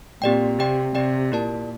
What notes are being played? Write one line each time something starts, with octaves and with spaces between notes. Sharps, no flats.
A#2 C4 G4 D5 G5
C3 C4 G4 D5 G5
C3 C4 G4 D5 G5
A#2 E4 G4 A#4 D5 A5